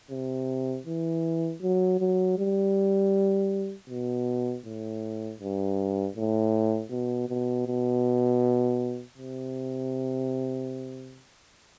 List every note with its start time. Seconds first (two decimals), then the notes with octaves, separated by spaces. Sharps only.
0.10 C3
0.86 E3
1.62 F#3
2.00 F#3
2.38 G3
3.89 B2
4.65 A2
5.40 G2
6.16 A2
6.91 B2
7.29 B2
7.67 B2
9.18 C3